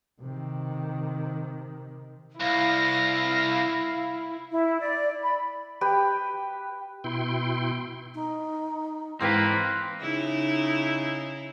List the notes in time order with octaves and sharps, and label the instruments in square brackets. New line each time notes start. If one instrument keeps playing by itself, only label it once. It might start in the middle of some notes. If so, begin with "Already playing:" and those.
[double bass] C3 D#3
[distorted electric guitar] C2 [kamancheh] E4 [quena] F5 [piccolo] A#6
[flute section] E4
D5
B5
[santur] G4 B4 G5
[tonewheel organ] B2 E4 G5 C6
[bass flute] D#4
[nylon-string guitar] G#2 E3 G5 [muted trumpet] A#3 [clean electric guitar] C4 B4
[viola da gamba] C#3 D#4 E4